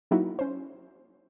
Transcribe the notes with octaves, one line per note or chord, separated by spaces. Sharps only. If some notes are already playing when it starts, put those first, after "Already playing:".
F#3 A#3 D#4 E4 F#4
C#4 C5